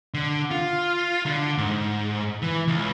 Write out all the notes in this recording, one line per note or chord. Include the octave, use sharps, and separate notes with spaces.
D3
F4
D3
G#2
E3
C#2